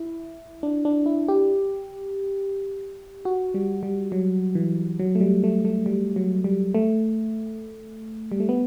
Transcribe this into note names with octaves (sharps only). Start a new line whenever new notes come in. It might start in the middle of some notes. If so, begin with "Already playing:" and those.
Already playing: E4
D4
D4
E4
G4
F#4
G3
G3
F#3
E3
F#3
A3
G3
A3
A3
G3
F#3
G3
A3
G3
A3
B3